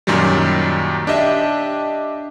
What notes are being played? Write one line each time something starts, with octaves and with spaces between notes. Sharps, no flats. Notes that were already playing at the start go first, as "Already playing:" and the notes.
F#2 A#2 D#3 F#3 G3
D4 G4 D#5 E5